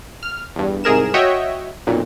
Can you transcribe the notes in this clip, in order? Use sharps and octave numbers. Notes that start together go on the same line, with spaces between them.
F6
E2 G2
C2 G#2 G#4 A#4 E7
F#4 C#5 D#5 E5 G5
B1 F2 A#2